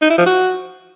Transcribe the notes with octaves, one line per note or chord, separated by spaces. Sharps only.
D#4
E4
F3
F#4